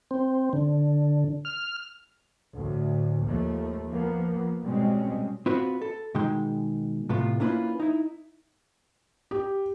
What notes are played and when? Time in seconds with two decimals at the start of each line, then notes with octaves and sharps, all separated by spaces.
0.11 C4
0.53 D3
1.45 F6
2.55 D2 A2
3.24 D#2 F3 A3
3.92 F3 A#3 B3
4.65 B2 G3 G#3 C4 C#4
5.46 C4 F4 F#4 B4
5.82 A4
6.15 B2 D#3 G#3 D#4 G#4 G5
7.09 A2 C3 A3 B3 F4
7.40 A#3 C#4 D4 E4 F4 B4
7.80 D#4 E4
9.31 G4